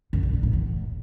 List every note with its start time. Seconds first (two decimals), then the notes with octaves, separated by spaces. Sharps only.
0.13 F#2
0.23 A#2
0.33 G2
0.43 A2
0.53 E2